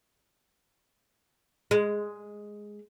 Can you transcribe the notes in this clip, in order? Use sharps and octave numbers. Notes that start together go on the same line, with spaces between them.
G#3